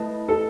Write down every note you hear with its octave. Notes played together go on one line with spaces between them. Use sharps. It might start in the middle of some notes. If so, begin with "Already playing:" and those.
Already playing: A3 E4 B4 D#5 A5
A4